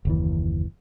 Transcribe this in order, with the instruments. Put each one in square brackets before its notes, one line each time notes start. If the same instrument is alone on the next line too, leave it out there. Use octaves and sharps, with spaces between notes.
[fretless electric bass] F#1 D#2 E3